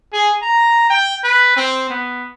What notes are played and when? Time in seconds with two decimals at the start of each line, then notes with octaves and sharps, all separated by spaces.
0.13 G#4
0.42 A#5
0.90 G5
1.24 B4
1.56 C4
1.90 B3